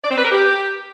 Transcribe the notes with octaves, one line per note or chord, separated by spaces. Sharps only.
D5
C4
B4
A#4
G4